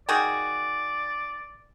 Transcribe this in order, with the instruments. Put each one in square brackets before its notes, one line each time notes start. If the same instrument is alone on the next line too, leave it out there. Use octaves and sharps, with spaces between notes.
[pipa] D#3 F#4 G#4 [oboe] D5